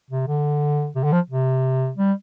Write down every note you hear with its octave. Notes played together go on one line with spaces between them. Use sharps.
C3
D3
C3
D3
F3
C3
G3